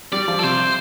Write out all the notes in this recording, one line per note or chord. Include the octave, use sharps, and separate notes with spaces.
G3 D5
F3
A4
C3 C5